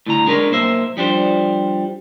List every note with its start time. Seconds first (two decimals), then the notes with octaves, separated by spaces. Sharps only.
0.06 A2 D3 A#5
0.26 G#3 D4 A#4 B4 C#5
0.51 B1 A#3 C5 E5
0.97 F3 G3 D4 C5